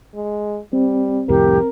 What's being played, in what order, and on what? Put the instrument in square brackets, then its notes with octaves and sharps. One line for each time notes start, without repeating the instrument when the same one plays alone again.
[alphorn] G#3
[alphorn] G3 [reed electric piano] C4
[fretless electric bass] C2 F2 A2 [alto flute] G4 [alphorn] A#4